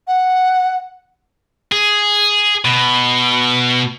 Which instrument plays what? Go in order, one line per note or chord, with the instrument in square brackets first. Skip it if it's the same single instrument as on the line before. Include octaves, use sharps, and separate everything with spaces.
[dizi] F#5
[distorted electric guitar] G#4
B2